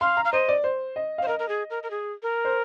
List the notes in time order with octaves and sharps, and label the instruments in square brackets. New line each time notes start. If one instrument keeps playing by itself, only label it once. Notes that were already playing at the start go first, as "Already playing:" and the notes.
[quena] F5 [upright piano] C6
[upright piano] A#5
[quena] F5
[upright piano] C5 [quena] D#5
[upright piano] D5
C5
D#5
F5
[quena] C5
[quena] A#4 [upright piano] D#5
[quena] A#4
G#4
A#4
A#4
G#4
A#4
[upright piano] C5